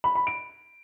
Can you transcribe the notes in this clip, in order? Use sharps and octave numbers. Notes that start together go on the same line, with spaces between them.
B5
B5
D7